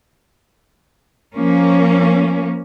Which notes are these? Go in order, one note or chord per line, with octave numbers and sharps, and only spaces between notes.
F3 A#3 C#4